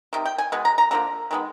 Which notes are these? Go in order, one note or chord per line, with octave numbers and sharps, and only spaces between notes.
C3 D#3
G5
G#5
B2 G#3
A#5
A#5
D3 F3 A#3 A#5
D#3 G#3 B3